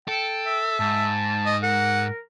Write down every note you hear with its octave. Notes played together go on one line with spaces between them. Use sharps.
A4 G5
E5
G#2 A5
D#5
A#4 F#5